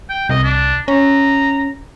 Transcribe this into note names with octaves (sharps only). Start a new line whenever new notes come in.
G5
C2 D#5
D4
C#4 A#5